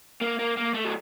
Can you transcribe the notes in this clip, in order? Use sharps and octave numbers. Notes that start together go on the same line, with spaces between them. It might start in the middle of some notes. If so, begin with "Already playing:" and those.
A#3
A#3
A#3
A3
F#3